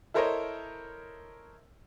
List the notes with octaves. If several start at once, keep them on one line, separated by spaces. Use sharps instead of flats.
E4 A4 A#4 C5 C#5 D#5